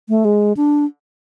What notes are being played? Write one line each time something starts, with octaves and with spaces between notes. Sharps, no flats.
A3
G#3
D4